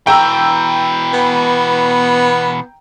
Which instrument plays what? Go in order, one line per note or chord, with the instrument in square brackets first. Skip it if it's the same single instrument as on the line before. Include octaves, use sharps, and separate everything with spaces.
[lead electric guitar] B2 E3 [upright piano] G5 A#5 E6
[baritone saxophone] B3